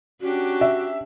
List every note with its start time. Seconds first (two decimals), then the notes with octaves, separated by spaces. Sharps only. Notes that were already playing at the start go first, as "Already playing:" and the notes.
0.21 C#4 D4 F#4 G4
0.61 E5